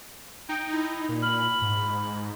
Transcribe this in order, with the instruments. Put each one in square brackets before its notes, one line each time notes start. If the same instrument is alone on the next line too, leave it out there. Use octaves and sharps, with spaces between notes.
[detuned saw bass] D#4 [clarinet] G5
[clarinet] E4
[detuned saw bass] A#2
[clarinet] B5 [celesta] F6 F#7
[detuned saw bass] G#2